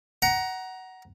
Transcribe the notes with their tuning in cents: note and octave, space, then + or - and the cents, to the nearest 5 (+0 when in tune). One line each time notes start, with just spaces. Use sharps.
F#5 +15 A#5 +15